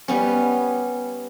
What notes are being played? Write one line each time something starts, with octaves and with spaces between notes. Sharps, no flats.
G3 B3 C#4